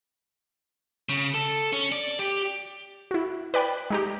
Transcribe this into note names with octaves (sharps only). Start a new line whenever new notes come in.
C#3
A4
C#4
D5
G4
E4 F#4
B4 D5 G5 B5
G#3 D#4 G4